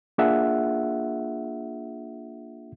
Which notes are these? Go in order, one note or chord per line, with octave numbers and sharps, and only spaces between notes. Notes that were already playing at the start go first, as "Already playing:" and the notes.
A#3 D4 F4 G#4 E5 F#5